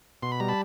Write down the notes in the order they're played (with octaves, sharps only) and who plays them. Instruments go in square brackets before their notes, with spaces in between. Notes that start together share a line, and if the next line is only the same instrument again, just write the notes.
[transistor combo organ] B2 C6
B5
G3 A#5
A5 B5